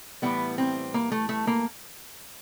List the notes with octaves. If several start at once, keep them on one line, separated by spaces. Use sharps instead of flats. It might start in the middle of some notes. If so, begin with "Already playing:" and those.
A2 E3 G3 B3
C4
A#3
A3
A3
A#3